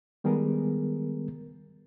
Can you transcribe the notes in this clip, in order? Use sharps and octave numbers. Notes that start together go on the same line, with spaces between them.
D#3 G3 G#3 B3 G#4 A#4